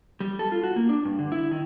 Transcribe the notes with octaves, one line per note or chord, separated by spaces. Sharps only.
G3
A4
F4
F#4
A#3
D4
G2
D3
E4
D#3